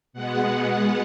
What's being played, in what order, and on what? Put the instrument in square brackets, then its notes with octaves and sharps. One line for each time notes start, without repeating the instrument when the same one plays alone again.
[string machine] B2 G#3 B3 F#5